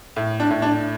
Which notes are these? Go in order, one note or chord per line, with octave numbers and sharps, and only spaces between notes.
A2
D4
A2
D4